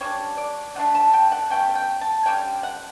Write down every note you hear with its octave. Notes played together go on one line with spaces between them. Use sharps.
C#3 G3 D4 C#5
D5
D3 A3 D4 F#5
A5
G5
F#5
B2 A3 C#4 G5
G5
A5
D3 G3 C#4 G5
F#5